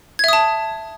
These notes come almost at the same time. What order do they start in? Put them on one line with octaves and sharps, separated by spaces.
G#6 E5 D#6 A5